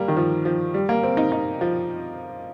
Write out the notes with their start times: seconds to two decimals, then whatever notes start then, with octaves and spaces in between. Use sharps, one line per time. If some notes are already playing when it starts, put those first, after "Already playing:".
Already playing: G3 A#3
0.08 D#3
0.17 F3
0.45 F3
0.74 G3
0.89 A#3
1.03 C4
1.17 D#4
1.32 D#4
1.61 F3